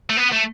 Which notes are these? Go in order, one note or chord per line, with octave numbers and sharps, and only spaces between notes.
A3
B3
A3